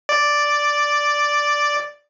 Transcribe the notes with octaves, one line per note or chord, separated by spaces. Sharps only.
D5